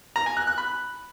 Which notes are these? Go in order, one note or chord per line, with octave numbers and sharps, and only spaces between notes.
A#5
G#5
F#6
F#6
B5